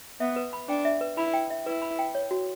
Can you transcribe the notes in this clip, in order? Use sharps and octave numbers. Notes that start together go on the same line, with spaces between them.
B3 E5
B4
B5
D4 G5
E5
B4
E4 B5
G5
E5
E4 B4
B5
G5
C#5
F#4